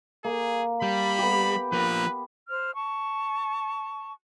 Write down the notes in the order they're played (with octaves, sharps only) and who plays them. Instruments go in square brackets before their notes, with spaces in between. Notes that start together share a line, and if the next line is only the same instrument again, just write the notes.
[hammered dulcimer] A#3 [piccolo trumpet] G#4
[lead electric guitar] G3 [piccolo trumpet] B5
[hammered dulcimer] B3 G4
[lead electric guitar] F3 A#3 [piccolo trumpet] B4
[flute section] C5 F6
A5 C#6